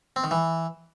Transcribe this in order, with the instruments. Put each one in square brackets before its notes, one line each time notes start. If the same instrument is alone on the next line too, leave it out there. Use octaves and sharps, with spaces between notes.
[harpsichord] C4
D#3
E3